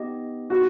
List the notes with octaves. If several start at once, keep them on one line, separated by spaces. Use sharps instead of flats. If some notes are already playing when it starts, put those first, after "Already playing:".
Already playing: B3 D#4 G4 D#5
B3 D#4 F#4 G4